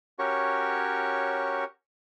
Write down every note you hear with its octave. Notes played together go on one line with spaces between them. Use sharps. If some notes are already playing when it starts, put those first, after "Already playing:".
C#4 F#4 G4 A#4 C#5 C#6